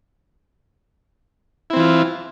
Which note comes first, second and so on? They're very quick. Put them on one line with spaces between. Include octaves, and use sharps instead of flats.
E4 C4 E3 F4